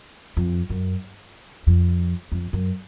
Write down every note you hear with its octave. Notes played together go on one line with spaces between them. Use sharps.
F2
F#2
F2
F2
F#2